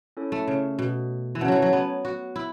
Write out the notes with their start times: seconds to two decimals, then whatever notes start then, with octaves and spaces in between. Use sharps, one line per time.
0.17 C#4 E4 A4 C#5
0.32 A3
0.48 C#3
0.79 B2
1.35 E3
1.41 C#3 C#4 F#4 C#5 F#5 A5
1.48 E3 F#3
1.62 F#3
1.73 B3
2.05 F#4
2.36 E4